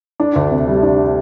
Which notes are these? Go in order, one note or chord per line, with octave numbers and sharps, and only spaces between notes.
D4
D2
C3
G3
D4